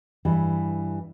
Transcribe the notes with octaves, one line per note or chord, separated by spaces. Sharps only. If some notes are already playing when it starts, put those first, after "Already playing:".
G2 E3 G3